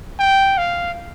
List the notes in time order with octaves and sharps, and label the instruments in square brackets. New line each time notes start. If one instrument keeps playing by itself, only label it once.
[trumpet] G5
F5